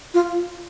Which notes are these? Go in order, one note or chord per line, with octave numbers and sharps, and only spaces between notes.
F4